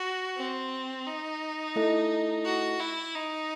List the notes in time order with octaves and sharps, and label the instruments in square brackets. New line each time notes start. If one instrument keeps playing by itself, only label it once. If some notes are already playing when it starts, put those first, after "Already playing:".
Already playing: [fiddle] F#4
C4
D#4
[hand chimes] A3 E4 A4 D#5
[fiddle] F#4
E4
D#4